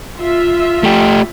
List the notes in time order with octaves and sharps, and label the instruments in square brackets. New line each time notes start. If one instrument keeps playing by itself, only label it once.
[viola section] F4 E5
[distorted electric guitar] A3 G4